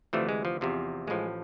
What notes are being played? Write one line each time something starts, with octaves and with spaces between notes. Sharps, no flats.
D2 C3 E3 F3 A3
G#3
F3
E2 C3 F3
A1 A2 F3 G#3